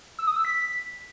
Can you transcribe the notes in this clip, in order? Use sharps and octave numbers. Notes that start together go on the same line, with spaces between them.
E6
D#6
E6
B6